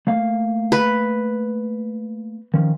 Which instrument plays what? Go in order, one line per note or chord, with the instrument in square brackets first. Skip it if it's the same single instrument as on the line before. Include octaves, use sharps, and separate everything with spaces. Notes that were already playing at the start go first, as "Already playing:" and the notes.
[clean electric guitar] A3 A#3 F5
[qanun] B4
[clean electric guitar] D#3 F3 C#4